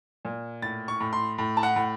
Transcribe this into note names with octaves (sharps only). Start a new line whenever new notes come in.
A#2
A2 A6
C#6
A2
C6
A2
A5
F#5
A2